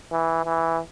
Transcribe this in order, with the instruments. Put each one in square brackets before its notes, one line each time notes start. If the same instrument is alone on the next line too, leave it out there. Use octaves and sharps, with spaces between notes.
[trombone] E3
E3